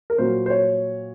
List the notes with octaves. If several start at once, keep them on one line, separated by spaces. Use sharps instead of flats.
A#4
A#2 F#3 C5
C5
C#5